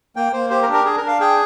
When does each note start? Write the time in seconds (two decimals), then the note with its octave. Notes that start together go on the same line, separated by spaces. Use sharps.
0.16 A#3 G5
0.33 A#3 C5
0.50 G4 C5
0.62 A#4
0.68 D4
0.73 A#4
0.85 D4 G#4
0.97 A#4
1.02 D4
1.08 F5
1.20 G#4 G5